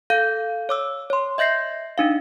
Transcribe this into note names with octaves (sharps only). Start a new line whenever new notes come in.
A4 F5 G6
C#5 D6 E6
C#5 C6
D#5 E5 G6 A#6 C7
D4 D#4 F5